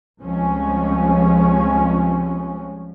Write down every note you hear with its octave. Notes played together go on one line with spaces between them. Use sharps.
C#2 F3 G3 G#3 C4 C#4